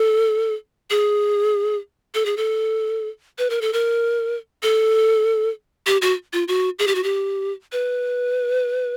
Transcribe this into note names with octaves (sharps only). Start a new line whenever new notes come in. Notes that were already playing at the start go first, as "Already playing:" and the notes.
Already playing: A4
G#4
A4
G#4
A4
B4
A#4
A4
A#4
A4
G4
F#4
F4
F#4
G#4
G4
F#4
G4
B4